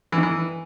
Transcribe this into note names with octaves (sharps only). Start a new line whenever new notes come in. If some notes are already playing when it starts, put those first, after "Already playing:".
E3
D#3
E3